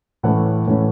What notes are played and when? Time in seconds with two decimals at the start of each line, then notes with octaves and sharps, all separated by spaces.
0.23 A2 E3 A3 C#4 F#5
0.67 A2 E3 A3 C#4